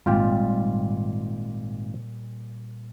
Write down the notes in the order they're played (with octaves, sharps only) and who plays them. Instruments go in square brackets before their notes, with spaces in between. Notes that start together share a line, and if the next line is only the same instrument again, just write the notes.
[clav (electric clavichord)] G#1 F4 G5 [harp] A#2 G3